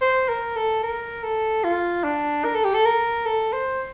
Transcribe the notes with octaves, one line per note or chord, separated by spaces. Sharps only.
C5
A#4
A4
A#4
A4
F4
D4
A#4
A4
G4
A4
A#4
A4
C5